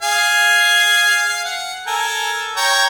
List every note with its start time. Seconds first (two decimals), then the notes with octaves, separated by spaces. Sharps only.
0.02 G#4 F5 G#5
1.45 F#5
1.87 A4 A#4 G#5
2.57 C#5 G5 A#5